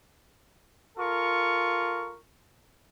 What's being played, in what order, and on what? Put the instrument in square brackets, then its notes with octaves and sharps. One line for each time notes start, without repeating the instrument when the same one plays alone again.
[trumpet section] F4 A4 A#4 C#6